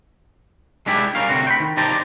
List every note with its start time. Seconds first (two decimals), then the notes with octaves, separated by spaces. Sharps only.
0.86 G#3 D4 E4 G4
1.15 G3 C#4 A#4 F5
1.29 D2 C3 C4 F#4
1.47 G5 B5
1.60 D#3
1.77 D#4 G4 C5 D5 A5 A#5